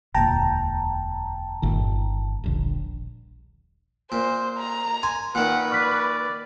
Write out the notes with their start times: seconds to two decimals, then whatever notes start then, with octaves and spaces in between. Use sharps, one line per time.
0.14 E1 D2 A#2 G5 A5 A#5
1.62 G1 A#2 D#3
2.44 D#1 A#1 D3
4.12 A#2 C5
4.58 A#5
5.03 G#5 C6
5.35 A#2 D#3 B4 F#5
5.71 D5 C#6 F6 B6